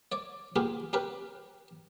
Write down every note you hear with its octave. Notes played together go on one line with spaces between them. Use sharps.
C#5 D5
A#3 B3 F4 G4 G#4
C#4 G4 A#4 B4